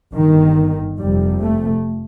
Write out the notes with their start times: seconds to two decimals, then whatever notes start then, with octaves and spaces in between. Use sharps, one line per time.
0.14 G1 G2 D#3
0.98 F1 F2 C3 G3
1.41 A3